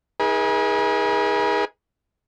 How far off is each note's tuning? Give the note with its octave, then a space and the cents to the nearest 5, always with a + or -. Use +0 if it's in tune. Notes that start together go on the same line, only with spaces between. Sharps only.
D#4 +45 G#4 -10 B4 -45